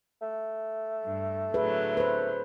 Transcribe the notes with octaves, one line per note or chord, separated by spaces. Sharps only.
A3
G2
A2 D3 F#3 G#4 B4
B4 C5